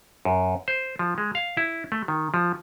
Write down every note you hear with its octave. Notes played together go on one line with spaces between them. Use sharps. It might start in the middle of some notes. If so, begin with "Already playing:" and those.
F#2
C5
F3
G#3
F5
E4
A3
D#3
F3